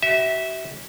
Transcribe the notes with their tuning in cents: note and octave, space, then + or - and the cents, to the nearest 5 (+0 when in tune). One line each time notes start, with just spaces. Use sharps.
F#4 +40 E5 -15